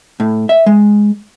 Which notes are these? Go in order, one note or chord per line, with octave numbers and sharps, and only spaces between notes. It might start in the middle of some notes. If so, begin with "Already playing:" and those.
A2
E5
G#3